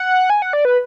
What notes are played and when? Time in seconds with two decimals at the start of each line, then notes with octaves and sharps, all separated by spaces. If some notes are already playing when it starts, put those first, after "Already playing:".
Already playing: F#5
0.30 G#5
0.42 F#5
0.53 D5
0.65 B4